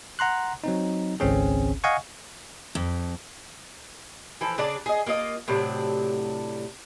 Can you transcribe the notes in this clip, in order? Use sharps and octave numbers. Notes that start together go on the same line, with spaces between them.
F#5 A#5 C6 F#6
F#3 C4 D#4
G#1 C#2 C4 C#4 G#4
D#5 F5 F#5 G#5 C#6
F2
E3 F3 A4
C#3 D4 G#4 D5
G#4 D#5
A#3 D4 F4 D#5
A2 C3 F#3 D4